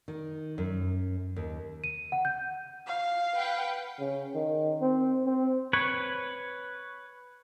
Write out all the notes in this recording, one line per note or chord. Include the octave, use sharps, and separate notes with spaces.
D#3
F#2
D#2
D#7
F#5
G6
F5
B4 F#5 G5
C#3
D#3
C4
C4
B4 C#5